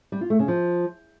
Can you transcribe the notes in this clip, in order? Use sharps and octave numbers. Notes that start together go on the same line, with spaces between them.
G3
F4
A3
C#3
F3